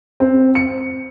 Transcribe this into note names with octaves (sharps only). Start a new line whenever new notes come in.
C4
C#7